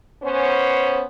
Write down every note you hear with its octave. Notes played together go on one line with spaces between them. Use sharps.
B3 C#4 C5